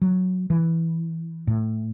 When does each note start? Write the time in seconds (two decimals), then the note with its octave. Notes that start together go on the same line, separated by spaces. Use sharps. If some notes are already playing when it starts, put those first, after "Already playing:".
0.01 F#3
0.50 E3
1.47 A2